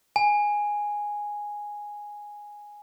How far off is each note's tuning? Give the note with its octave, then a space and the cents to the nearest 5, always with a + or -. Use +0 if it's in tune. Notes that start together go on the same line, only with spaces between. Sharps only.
G#5 -5